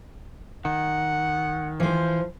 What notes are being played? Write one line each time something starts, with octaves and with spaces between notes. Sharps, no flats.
D#3 F#5
E3 F3 C5